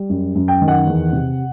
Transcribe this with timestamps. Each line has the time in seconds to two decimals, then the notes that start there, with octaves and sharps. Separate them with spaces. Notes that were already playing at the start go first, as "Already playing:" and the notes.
Already playing: G3
0.10 F#2
0.35 F#2
0.48 G5
0.62 D#3
0.68 F#5
0.87 E2
1.13 C3